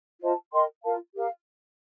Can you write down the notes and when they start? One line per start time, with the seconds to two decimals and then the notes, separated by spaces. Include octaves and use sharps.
0.20 F4 C5 D#5 A5
0.52 A#4 D#5 G5 C6
0.83 F4 A#4 F5 A5
1.14 G4 A#4 F5